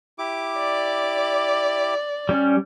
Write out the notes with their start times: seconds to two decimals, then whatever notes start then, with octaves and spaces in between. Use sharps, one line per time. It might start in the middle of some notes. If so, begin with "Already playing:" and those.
0.19 E4 G4 D6
0.60 D5
2.29 G3 C#4